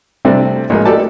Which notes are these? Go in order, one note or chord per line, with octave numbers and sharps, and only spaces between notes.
C3 G3 A3 C4 D4
A#1 A2 G#3 A#4 D#5
G4 A4 D5 D#5 A5